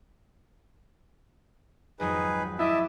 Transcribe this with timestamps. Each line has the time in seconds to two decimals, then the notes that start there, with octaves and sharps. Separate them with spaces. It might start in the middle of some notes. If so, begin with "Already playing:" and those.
2.00 G#1 F2 F#3 D#4 G#4 B4
2.59 E4 D#5 E5 A5 D6 E6